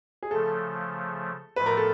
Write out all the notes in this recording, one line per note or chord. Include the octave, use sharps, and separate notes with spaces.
G#4
C#3 F3 A3 A4
A2 F3 A3 B4
A#4
A4